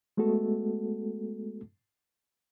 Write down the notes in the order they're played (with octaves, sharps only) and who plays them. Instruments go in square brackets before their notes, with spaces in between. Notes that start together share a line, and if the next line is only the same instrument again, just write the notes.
[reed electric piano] G#3 A3 B3 F#4 A4